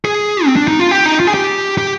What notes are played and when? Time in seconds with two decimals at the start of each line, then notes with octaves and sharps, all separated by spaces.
0.05 G#4
0.46 C4
0.56 D4
0.68 D#4
0.80 F4
0.91 G4
1.06 D#4
1.20 F4
1.27 G#4
1.34 G4
1.78 G4